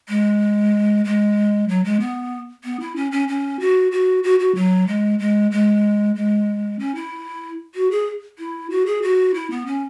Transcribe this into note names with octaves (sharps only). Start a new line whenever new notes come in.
G#3
G#3
F#3
G#3
B3
B3
E4
C#4
C#4
C#4
F#4
F#4
F#4
F#4
F#3
G#3
G#3
G#3
G#3
C#4
E4
F#4
G#4
E4
F#4
G#4
F#4
E4
B3
C#4